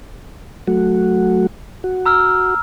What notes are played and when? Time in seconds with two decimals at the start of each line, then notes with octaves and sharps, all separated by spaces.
0.67 F#3 A3 F#4
1.84 F#4
2.06 A#5 E6 F6